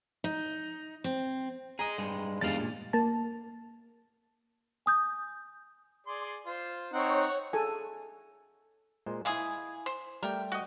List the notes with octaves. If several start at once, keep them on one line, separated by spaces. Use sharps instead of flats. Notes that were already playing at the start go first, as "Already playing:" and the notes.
D#4
C4
G#4 D#5 A#5
G2 G#3
E2 G2 D#3 G#3 F5 A6
A#2
A#3 A5
G#5 D#6 G6
G#4 D5 C6
F4 C5
C4 D#4 C#5 F#5 C#6
G#4 A4 G#5
A#2 G#3 C5
E3 G#3 E4 G#4 F5
C5
G3 A3 G4 A#4 G5
F#4 D#5